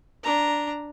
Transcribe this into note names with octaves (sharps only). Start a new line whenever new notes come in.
D4 A#5